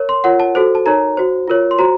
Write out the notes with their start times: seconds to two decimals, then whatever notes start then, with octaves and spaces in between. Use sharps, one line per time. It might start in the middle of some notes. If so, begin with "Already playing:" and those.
Already playing: A#4 C#5
0.09 C6
0.24 F4 A#4 C#5 F#5
0.40 A5
0.55 F#4 A4 C5
0.75 A5
0.86 D#4 A#4 C#5 A#5
1.17 F#4 C5
1.48 F4 A#4 C#5
1.71 C6
1.79 F#4 C5 A#5